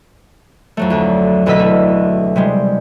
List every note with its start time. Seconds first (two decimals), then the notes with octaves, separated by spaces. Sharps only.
0.77 F2 F#3 A3
0.90 D2 D4
1.46 E1 D2 B2 D#5 E6 B6
1.60 A3
2.36 C3 G3 G#3